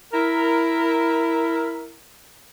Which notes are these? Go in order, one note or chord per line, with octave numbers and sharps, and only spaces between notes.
E4 A#4